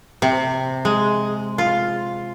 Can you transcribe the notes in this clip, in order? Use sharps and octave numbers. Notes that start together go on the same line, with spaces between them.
C3
G#3
F4